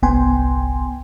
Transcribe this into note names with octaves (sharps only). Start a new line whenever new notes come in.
G1 C2 B3 G5 G#5 C6